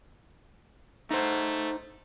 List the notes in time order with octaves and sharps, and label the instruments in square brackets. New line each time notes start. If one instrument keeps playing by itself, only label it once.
[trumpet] A3 [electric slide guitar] D#4 C5